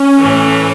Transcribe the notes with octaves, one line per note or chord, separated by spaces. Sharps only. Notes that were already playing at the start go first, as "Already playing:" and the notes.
Already playing: C#4
A2 E3 A3